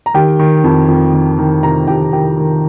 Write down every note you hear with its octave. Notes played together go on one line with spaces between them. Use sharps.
A#5
D#3 G4 G5
D#3
F2
F2
D#3
D#3
C3 A#4 A#5
F2 G4 G5
D#3 G4 G5
D#3